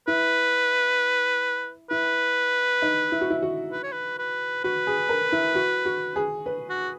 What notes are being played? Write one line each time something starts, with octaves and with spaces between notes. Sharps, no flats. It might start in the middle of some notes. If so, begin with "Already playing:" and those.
E4 B4
E4 B4
D#4
E4
F#4
E4
F#4
B4
C#5
B4
B4
F#4 B4
G#4
A#4
E4
F#4
F#4
G#4
B4
F#4